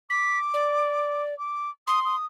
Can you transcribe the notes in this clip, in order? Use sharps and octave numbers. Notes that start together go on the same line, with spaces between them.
D6 B6
D5
D6
C6 D#6
D#6